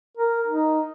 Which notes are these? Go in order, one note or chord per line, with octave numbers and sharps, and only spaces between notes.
A#4
D#4